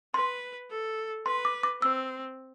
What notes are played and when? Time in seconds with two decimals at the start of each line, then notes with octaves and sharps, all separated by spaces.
0.14 B4 C6
0.70 A4
1.26 B4 C6
1.45 D6
1.63 D6
1.82 C4 E6